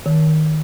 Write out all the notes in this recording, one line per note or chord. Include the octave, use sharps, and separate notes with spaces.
D#3